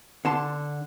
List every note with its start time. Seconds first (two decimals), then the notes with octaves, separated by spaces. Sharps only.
0.25 D3 A5 C6